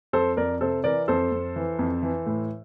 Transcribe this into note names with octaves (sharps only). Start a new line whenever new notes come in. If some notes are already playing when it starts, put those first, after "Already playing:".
F2 A4 C5
F2 A#4 D5
C3 A4 C5
E3 A#4 D5
F2 A4 C5
F2
E3
F2
E3
A2